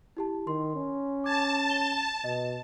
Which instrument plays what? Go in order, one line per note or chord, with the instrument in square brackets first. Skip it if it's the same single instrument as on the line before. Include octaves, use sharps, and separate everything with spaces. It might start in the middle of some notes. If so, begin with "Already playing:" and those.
[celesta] E4 G4 A5
[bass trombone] D#3 [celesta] C6
[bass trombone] C#4
[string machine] A5 [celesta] D6 G#6 A6
[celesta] G7
[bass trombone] B2 [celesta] D#5